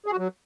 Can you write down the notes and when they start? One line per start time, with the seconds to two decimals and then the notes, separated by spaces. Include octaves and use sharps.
0.06 G#4
0.12 F#4
0.18 F#3